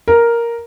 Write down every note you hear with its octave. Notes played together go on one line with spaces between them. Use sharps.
A#4